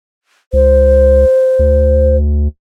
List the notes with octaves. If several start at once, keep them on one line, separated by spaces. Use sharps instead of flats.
C#2 C5
D2